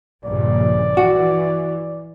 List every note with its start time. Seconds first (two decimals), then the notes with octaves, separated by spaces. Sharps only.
0.25 A#1 G2 C#3 D5
0.97 E3 F#4